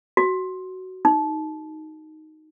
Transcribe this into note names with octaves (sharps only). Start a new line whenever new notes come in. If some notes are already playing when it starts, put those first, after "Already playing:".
F#4
D#4